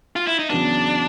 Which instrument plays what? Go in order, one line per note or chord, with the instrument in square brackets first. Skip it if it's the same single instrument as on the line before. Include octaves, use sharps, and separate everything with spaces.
[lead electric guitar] F4
E4
D#4
[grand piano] E2 C#3 F#3 B3 [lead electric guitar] D4